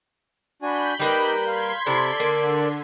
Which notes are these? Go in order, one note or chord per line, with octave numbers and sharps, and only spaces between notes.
D4 F#4 G#5 B5 G6
G3 A#3 D#4 G4 B4
F5 C6 G#6 B6
C3 E4 A4 D5
D3 A#3